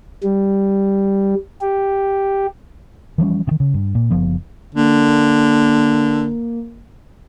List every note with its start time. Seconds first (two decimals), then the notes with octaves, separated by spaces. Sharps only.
0.23 G3
1.61 G4
3.18 E3 F3 G3 C#4
3.47 C3 D#3
3.60 C#3
3.74 G2
3.95 A#2
4.10 F#1 F3 B3
4.75 D3 A#3